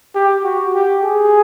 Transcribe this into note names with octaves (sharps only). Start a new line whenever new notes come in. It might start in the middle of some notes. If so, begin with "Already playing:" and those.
G4
F#4
G4
G#4